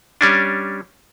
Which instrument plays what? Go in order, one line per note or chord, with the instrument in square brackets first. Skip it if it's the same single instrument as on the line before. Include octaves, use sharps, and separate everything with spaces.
[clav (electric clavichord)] G3 C#4 D4